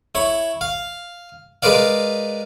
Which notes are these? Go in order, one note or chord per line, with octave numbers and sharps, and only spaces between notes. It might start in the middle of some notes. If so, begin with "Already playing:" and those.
E4 C#5
F5
G#3 A#4 B4 D5 F5